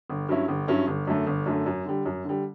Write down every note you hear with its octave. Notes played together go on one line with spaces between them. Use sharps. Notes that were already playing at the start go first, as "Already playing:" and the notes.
G1
G2 F#3 C#4 E4
G1
G2 F#3 C#4 E4
G1
F#2 D3 A3
G1
F#2 D3 A3
F#2
D3 G3
F#2
D3 G3